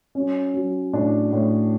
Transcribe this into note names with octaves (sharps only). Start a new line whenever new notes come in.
F#3 C#4
F#3
A2 D4
A2